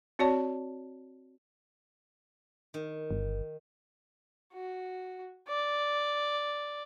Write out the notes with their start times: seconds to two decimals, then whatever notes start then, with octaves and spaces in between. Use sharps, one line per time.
0.19 C4 F#4 C#5 D5 A5
2.74 D#3
3.11 G1
4.54 F#4
5.48 D5